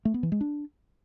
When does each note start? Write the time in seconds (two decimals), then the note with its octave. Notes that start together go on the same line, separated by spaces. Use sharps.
0.05 A3
0.14 B3
0.23 E3
0.32 G#3
0.41 D4